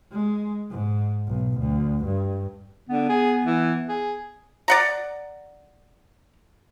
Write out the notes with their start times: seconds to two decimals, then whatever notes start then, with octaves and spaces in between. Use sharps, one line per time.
0.12 G#3
0.70 G#2
1.28 B1
1.60 D2
2.05 G2
2.89 D3 B3
3.09 G#4
3.45 E3
3.89 G#4
4.68 D5 F#5 A#5